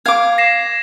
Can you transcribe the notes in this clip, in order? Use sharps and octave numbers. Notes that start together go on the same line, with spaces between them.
F5 D6 G#6
A#6 C7 E7